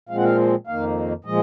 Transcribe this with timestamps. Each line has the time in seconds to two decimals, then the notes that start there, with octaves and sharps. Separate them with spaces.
0.09 A#2 F3 G#3 C4 F5
0.17 F#5
0.24 F5
0.67 F2 D#3 A#3 F5
1.25 A#2 F3 G#3 D#5